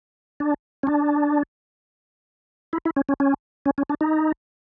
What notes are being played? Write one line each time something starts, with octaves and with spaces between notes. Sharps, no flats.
D4
C#4
D4
E4
E4
C#4
C#4
C#4
C#4
C#4
D4
D#4